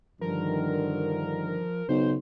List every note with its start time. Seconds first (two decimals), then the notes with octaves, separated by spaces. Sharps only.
0.21 G2 D3 D#3 F3 A#4
1.89 B1 C#3 C5